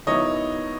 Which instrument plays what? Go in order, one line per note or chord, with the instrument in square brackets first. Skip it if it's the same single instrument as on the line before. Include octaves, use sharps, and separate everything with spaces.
[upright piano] D#3 F#3 B3 E4 C#5 D#5